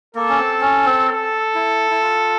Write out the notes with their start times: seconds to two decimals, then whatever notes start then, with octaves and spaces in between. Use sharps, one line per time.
0.15 A#3 A4
0.29 C#4
0.38 C4
0.61 C#4
0.85 C4
1.09 A4
1.55 E4
1.91 E4
2.03 F4